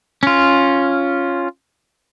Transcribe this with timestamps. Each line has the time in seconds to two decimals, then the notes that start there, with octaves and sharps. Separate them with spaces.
0.23 C#4 F4